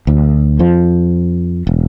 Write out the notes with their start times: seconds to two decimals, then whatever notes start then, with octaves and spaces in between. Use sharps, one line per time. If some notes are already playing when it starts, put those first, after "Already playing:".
0.07 D2
0.59 F2 F3
1.67 E1